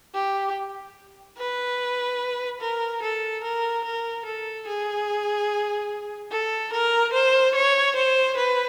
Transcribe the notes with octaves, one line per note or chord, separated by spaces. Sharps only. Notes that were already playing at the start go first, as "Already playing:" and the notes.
G4
B4
A#4
A4
A#4
A#4
A4
G#4
A4
A#4
C5
C#5
C5
B4